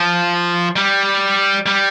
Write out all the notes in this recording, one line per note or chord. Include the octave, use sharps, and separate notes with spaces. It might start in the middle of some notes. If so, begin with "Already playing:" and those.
Already playing: F3
G3
G3